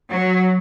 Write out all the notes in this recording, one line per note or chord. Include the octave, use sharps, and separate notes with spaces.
F#3